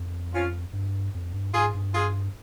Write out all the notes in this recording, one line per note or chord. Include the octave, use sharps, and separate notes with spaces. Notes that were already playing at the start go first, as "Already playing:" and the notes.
Already playing: F2
C#4 F4
G2
F2
G2
G#2 F4 G#4
G2
F4 G#4